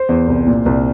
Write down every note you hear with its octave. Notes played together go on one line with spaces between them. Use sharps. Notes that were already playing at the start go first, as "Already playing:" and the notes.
Already playing: C5
E2
C2
A#2
C2